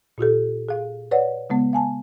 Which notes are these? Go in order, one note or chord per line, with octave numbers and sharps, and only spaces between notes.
A#2 F4 G4 A4
G#4 F5
B4 C#5 D5 F#5
C#3 G#3 B3
F5 G#5 A5